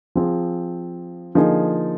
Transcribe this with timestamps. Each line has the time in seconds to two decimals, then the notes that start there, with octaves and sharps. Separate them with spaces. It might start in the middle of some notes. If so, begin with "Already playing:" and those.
0.15 F3 C4 F4 G#4
1.35 D3 F3 A#3 D#4 G#4